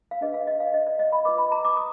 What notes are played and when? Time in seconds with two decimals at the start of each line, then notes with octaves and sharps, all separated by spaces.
0.11 F5
0.21 D4 G#4 B4 D#5
0.34 F5
0.47 D#5
0.60 F5
0.74 D#5
0.86 D5
0.99 D#5
1.12 B5
1.25 F4 B4 D6
1.38 B5
1.52 A#5
1.65 D6
1.77 D#6